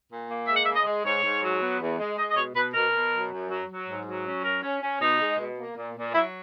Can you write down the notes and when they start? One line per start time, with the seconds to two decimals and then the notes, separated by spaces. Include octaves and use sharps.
0.11 A#2
0.29 A#3
0.48 G#3 E5
0.56 F#5
0.65 C#3 E5
0.76 D#5
0.85 G#3
1.05 G#2 C#5
1.23 G#2
1.43 F#3
1.62 B3
1.80 E2
1.99 G#3
2.17 G#3 D#5
2.30 D#5
2.37 B2 C#5
2.55 B2 B4
2.74 B2 A#4
2.93 B2
3.12 F#3
3.31 F#2
3.50 F#3
3.69 F#3
3.88 G#2
4.06 F#3
4.25 C#4
4.44 F#3 A#4
4.63 C#4
4.82 C#4
5.01 B2 D#4
5.20 G#3
5.39 B2
5.57 A#3
5.77 A#2
5.95 A#2
6.14 F#3 E4